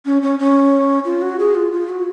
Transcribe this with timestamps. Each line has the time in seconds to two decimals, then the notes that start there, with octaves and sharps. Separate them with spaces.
0.06 C#4
0.22 C#4
0.39 C#4
1.05 F4
1.22 F#4
1.39 G#4
1.55 F4
1.72 F4
1.89 F#4